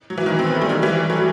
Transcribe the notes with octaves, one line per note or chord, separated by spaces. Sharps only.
F#3
E3
D#3 F#3
C4
B3
A3
G3
D#3 F#3
E3 G3
F#3 A3